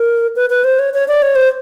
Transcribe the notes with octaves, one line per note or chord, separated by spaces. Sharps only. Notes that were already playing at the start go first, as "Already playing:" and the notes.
Already playing: A#4
B4
B4
C5
C#5
C#5
D5
C#5
C5